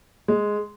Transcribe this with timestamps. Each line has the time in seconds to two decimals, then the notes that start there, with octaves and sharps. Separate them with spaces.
0.28 G#3